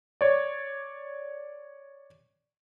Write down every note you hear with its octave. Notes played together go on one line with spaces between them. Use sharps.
C#5 D5